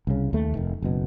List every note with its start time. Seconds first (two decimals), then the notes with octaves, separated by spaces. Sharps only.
0.07 C2 C#3
0.33 D#2 A3
0.55 F1 D#3
0.82 F#1 B2